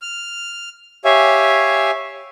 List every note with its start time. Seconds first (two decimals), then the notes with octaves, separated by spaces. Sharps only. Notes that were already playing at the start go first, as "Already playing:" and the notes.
0.02 F6
1.05 G4 C#5 E5 F5 G#5